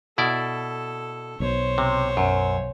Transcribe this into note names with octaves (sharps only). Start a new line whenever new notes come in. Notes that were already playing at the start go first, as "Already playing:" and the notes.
B2 E4 A4 D5
B1 B2 C5 C#5
C3
F#2